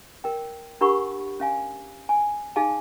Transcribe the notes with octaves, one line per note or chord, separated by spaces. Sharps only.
A#4 G5
D4 G4 A#4 F#5 B5 C#6
C#4 F5 G#5
G#5
D#4 G#4 F5 G#5 A5